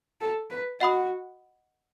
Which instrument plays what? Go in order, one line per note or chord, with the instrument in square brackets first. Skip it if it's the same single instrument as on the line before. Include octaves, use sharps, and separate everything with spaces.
[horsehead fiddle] A4
B4
[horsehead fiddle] F#4 [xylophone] D#5 F#5 B5 D#6